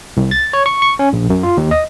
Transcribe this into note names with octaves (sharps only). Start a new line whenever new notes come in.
C2
A6
C#5
C#6
C#6
C#4
A#1
F#2
F4
D#2
D#5